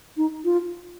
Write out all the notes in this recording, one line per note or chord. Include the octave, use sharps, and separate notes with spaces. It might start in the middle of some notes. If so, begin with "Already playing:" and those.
D#4
F4